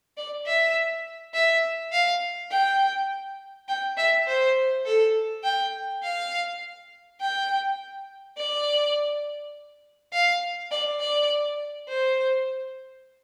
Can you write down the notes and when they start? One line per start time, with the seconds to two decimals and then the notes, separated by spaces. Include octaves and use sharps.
0.17 D5
0.46 E5
1.34 E5
1.92 F5
2.51 G5
3.68 G5
3.97 E5
4.27 C5
4.86 A4
5.44 G5
6.03 F5
7.20 G5
8.37 D5
10.13 F5
10.71 D5
11.00 D5
11.88 C5